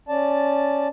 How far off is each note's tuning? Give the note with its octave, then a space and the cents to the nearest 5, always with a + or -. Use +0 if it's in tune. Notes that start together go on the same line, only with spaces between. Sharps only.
C#4 +0 D5 +0 A5 +0